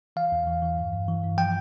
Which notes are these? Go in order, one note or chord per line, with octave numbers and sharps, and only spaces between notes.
E3 F5
E2
E3
E3
G2
G2
E3
G2
F3 G5